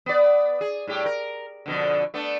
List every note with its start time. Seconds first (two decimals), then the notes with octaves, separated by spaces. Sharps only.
0.06 B3 D5
0.61 G#4
0.87 A2 G3 G4
1.06 A#4
1.66 F2 B2 D3
2.14 A3 B3 D4